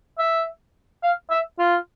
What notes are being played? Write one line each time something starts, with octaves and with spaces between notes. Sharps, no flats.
E5
F5
E5
F4